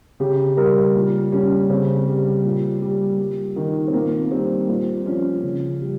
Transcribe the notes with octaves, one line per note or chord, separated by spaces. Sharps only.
C#3 G4
G3 A#4
A#2
G3 C#4
C#3 C4
G3
A#2
G3
G3
D#3
C4
A#2 A#3
A#3
G3 C4
A#2 C4
F3 C#4
C#3
G3